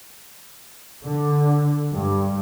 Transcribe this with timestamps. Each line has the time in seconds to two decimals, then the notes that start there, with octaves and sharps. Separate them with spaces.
1.05 D3
1.92 G2